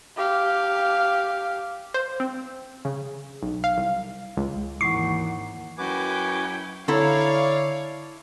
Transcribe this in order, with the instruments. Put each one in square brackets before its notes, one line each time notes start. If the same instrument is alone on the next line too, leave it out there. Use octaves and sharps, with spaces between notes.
[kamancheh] G4 F5
[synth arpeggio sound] C5
C4
C#3
B1
F5
C2
C#2
[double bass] G#1 D#2 [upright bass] E3 [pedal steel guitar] F#5 C#6 D6 [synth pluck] C7
[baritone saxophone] F#2 [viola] E4 G5 [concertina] F#4 B4 D6 [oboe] G#5
[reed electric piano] D3 [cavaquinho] E4 A4 A#5 [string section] C#5 D5 F5